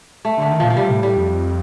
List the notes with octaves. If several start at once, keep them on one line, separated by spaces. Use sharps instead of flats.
A3
D3 A3
D#3
A#2 F3
F3
C3 G3
A2
A2 G3
F2